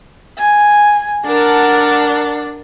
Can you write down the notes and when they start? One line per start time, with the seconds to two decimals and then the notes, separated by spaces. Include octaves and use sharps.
0.39 G#5
1.26 D4 A#4 F#5 A5